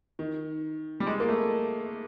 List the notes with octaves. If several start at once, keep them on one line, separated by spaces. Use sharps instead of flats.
D#3
G3
G#3
A#3
A3